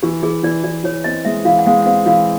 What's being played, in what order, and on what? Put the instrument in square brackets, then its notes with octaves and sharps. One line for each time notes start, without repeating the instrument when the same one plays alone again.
[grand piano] E3 [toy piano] G4
[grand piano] E3 [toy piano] G#4
[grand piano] E3 [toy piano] D5
[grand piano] E3 [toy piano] D5
[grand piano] E3 [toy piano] C#5
[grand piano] C4 [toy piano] D#5
[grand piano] G#3 [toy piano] E5
[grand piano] E3 [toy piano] F5
[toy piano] F#5
[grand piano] G#3 [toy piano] F5
[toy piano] F#5
[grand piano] C4 [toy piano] F5
[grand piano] E3 [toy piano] F5